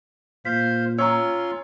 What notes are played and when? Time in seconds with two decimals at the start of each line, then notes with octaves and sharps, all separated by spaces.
0.45 A#2 C5 F5 B6
0.98 C#4 F4 C#5 A#5 C6 C#6 E6